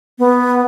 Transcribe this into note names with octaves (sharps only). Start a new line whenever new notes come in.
B3